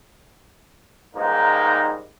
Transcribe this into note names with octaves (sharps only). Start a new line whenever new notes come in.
C#2 G#2 G3 A#3 D#4